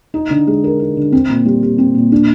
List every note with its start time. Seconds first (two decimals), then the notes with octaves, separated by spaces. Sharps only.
0.14 D#4
0.30 D3
0.47 G#3
0.64 A#4
0.79 D#4
0.97 D3
1.12 C4
1.30 A#2
1.45 G3
1.63 G4
1.78 C4
1.95 A#2
2.12 D4